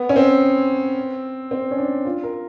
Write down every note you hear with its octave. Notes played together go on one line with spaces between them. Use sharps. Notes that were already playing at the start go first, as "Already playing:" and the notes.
Already playing: B3
C#4
C4
C4
C#4
D4
F4
A#4